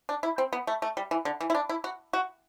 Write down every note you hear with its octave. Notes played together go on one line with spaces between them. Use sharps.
D4
E4
C4
B3
A3
A3
G3
E3
D3
E3
E4
D4
E4
F#4
F#4